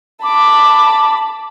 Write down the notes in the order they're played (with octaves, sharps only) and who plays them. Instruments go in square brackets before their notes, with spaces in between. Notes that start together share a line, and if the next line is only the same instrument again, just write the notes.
[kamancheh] A5 B5 [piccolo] D6